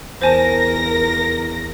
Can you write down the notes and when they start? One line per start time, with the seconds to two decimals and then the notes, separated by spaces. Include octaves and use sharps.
0.22 E2 A#4 C5 G#5 A5 A#6